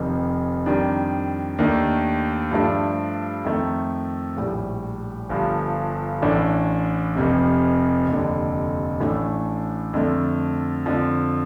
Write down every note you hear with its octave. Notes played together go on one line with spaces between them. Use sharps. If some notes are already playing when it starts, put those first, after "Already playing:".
Already playing: F1 F2 D#3
F2 D#3 G3 D4
D#2 D#3 A3 D4
G2 F3 A3 D4
F2 D#3 A3
A#1 A2 G3
G1 G2 F3
A1 A2 A3 D4
F1 F2 C3
F1 D#2 D3
A1 A2 A3 D4
F2 D3 A3
F2 D3 F3